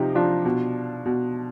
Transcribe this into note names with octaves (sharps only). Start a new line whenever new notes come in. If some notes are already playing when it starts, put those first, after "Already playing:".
Already playing: C3 F3 D#4 F4 G4
F3 D4 F4
B2
B2